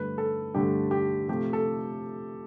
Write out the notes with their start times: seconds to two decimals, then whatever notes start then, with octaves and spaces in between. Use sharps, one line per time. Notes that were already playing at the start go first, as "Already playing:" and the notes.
Already playing: G2 D3 A3 B4
0.18 A4
0.54 G2 D3 A3 G4
0.91 G4
1.28 C3 F3 A3 G4
1.53 A4